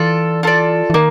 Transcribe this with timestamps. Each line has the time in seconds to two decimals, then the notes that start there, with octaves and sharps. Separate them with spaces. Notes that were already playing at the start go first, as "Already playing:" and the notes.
Already playing: E3 F4 A4 D5
0.43 F4 A4 D5
0.90 E3
0.94 D#3 A#3